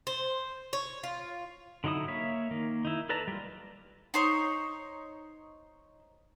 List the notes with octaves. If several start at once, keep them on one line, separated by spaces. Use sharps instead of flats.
C5
C#5
F4
D3 F#3 D#4 E4 D#6
A#3 C#5 E5 F5
D#3 A#3
D#4 E4
A4 B4 D5 A5 A#5
G3 F4
D#4 C5 C#5